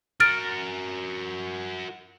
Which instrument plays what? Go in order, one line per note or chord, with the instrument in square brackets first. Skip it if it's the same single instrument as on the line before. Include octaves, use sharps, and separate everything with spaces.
[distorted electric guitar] F#4 A#4 [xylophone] F6 A6 D7